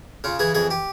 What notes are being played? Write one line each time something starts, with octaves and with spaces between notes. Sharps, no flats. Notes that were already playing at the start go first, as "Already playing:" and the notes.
C#3 F4
E3 G#4
F2 G#4
G4